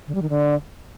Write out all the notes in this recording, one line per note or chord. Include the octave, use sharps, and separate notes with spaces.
D3
G3
D#3
D3